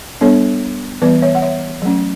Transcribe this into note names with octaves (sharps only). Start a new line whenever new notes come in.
G3 B3 D4 A4 C#5
E3 G3 B3 B4 D5
C#5 E5
F#5
C#5 E5
F#3 A3 C#4